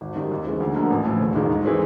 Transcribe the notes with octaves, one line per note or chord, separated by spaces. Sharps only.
G#1
F#2 D#3 G3
D#2
C#3 E3 G#3 C4
D2
D3 F3 A#3 D#4
A1
A2 F3
E1
D#2 D#3 G#3
G#2
E3 G#3 C4